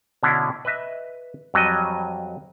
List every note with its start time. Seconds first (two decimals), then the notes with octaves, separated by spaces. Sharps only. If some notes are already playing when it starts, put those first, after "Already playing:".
0.23 B2 D3 C#4 D4 E4
0.65 B4 D#5 E5
1.54 F2 F#3 G3 D#5